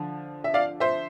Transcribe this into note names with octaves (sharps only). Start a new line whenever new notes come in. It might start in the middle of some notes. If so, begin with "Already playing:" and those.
Already playing: D3 F3
E5
D5 F5
C5 E5